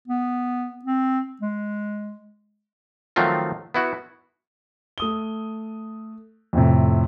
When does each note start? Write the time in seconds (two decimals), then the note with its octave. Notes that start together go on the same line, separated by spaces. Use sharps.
0.08 B3
0.85 C4
1.41 G#3
3.16 D#3 F3 F#3 A3 C4 F4
3.74 B3 E4 F#4
4.98 A3 D#6 G7
6.53 F2 A2 C3